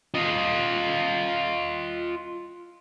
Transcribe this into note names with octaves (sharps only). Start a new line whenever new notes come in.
F4 D#5